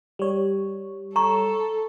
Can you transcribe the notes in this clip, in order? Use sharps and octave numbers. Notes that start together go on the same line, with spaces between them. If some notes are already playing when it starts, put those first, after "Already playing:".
G3 C#5
A4 A#5 C#6